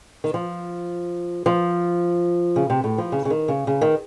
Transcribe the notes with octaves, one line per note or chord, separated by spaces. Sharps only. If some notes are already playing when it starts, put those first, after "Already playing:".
D#3
F3
F3
C#3
C3
A2
F3
C#3
C#3
D#3
C#3
C#3
D#3